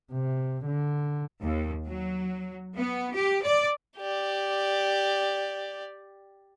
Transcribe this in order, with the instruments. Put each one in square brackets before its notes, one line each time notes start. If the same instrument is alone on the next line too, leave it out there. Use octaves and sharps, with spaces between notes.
[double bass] C3
D3
[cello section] D#2
F#3
B3
G4
D5
[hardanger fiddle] G4 D5